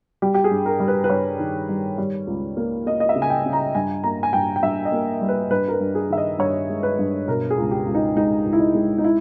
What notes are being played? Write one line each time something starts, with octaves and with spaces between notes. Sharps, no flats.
G3 G4
G4
G#4
G2
A#4
G3
B4
B4
G2 C#5
D#3
G3
G3
C#2
A#3
A#3 D#5
D#5
E5
C#3
G#5
G5
C#3
A#5
G2 G#5
A#3 A#5
G#5
G2 G5
G5
G2 E5
D#5
A#3
G3
B4
G2 B4
A#4
B4
G2
G#4
D#3 E5
D#5
G2 C#5
G#3
B4
G2
B2 A#4
G#4
C#2
G4
C#2
D#4
G#3 D#4
C#2
E4
D#4
G#3
D#4
E4